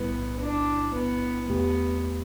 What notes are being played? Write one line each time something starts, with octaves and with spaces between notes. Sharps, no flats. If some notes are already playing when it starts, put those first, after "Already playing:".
Already playing: B1 A2 G3 B3 E4
D4
B3
E2 B2 A3 B3 G4